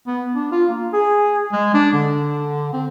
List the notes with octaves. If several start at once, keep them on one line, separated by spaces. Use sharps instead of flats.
B3
D4
F4
A#3
G#4
G#3
D4
D3
C4